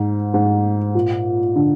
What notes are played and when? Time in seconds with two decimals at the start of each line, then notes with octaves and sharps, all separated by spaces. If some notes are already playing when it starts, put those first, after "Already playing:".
Already playing: G#2
0.34 G#2
0.95 A#2
1.56 D3